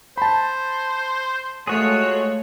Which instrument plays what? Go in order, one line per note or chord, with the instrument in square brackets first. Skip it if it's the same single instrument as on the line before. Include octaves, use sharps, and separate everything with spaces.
[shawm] C5 [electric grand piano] A5 B5
[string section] G#3 A3 C#5 [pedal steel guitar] F4 F#4 G#4